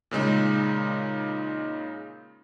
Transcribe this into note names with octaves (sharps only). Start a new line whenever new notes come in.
A#2 C#3 G#3 D#4